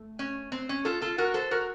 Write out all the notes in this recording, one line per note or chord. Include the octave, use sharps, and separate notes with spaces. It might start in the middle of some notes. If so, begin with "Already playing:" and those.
Already playing: A3
C#4
C4
C#4
F4 A4
F4 A4
F#4 A#4
A4 C5
F#4 A#4